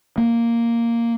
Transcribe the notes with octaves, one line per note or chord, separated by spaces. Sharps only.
A#3